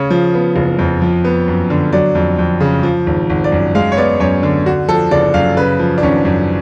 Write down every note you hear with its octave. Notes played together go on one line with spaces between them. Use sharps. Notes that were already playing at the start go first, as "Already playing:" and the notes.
Already playing: C#3 C#5
F3
B3
F#1
F2
F3
B3
F#2
D3
F#3 D5
F2
F2
C#3
F3
G#1
G#1
D5
F#2
G#3 F5
C#5
B3 D5
F#2 C#5
D3
D3 F#4
F3 A4
F#1 D5
F#2 F5
C#3 B4
F3
D4
G#1 C#4
F#2